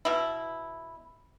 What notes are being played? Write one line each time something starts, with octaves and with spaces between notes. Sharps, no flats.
B2 E4